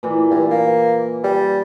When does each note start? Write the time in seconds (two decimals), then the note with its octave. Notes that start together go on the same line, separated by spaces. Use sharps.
0.03 A#2 E3 D5
0.31 G2
0.50 A#3
1.24 G3